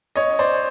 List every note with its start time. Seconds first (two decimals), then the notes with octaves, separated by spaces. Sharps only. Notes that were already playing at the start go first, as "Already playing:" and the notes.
0.16 C#4 C#5 D#5
0.39 C5 D5